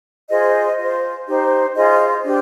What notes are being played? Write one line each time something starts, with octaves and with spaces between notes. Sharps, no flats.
F4 G#4 C5 D#5
F4
C5
D#4 G4 C5
F4 G#4 C5 D#5
D4 G4 C5